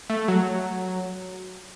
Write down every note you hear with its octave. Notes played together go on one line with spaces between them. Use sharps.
A3
F#3